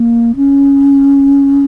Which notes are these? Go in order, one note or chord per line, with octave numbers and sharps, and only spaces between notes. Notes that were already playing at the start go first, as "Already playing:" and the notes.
Already playing: A#3
C#4